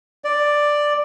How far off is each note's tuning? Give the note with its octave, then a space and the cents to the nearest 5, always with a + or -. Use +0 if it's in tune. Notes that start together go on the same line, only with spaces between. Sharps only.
D5 +5